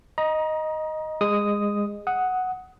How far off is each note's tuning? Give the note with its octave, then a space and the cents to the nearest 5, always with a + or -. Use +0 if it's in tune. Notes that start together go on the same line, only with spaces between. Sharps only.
D#5 +0 A#5 +30
G#3 -20 D#6 +0
F#5 +0 D#6 +15